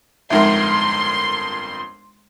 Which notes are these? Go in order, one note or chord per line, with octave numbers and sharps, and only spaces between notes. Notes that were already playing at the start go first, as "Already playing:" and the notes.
G1 F2 G#3 D#4 A#4 E5 C6